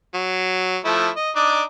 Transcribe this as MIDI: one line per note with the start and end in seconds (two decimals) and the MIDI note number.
0.14 0.77 54
0.85 1.09 53
0.85 1.09 57
0.85 1.09 64
1.16 1.31 75
1.36 1.63 62
1.36 1.63 63
1.36 1.63 86